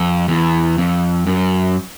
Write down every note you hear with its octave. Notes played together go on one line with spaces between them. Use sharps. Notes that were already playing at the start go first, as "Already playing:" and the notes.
Already playing: F2
E2
F2
F#2